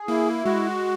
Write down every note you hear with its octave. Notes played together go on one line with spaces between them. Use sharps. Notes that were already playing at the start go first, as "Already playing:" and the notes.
Already playing: G#4
A#3 E4
G#3 F#4